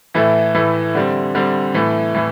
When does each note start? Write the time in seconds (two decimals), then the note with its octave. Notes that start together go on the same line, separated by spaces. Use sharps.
0.14 A2 E3 A3 E4
0.55 A2 E3 A3 E4
0.95 D3 G3 C4
1.35 D3 G3 C4
1.74 A2 E3 A3
2.14 A2 E3